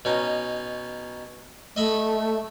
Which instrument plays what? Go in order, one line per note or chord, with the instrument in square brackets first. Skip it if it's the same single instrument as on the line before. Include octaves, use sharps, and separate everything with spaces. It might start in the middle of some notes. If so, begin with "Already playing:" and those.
[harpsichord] B2 C#4 D#4
[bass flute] A3 [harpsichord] D#5 E5 B5